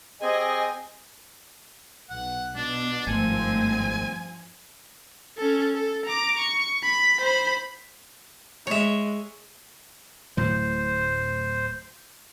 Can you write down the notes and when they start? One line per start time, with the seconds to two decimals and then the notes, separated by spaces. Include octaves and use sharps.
0.21 C4 G4 G#4 D#5 G#5
2.10 B1 F#5
2.55 B2 D4
3.07 G#1 G2 F3 A3 C4 G#5
5.37 C#4 A4
5.74 A4
6.06 A#5 D6
6.39 C#6
6.83 B5 B6
7.21 C5 B5
8.67 G#3 C#5 E5
10.37 D1 A2 F#3 C5